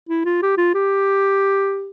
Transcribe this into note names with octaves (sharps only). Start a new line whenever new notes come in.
E4
F4
G4
F4
G4